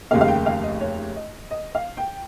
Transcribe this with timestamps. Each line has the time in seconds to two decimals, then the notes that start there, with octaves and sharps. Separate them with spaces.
0.11 F1 D#2 C#3 G3 A#3 F5
0.21 F5
0.28 G5
0.46 F5
0.63 D#5
0.80 C#5
1.16 D#5
1.51 D#5
1.75 F5
1.97 G5